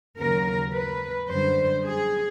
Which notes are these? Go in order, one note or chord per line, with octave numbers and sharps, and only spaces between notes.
D#2 C#3 F#3 A#4
B4
F#2 D3 G3 C5
G#4